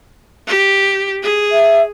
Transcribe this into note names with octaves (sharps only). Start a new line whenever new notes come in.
G4
G#4
E5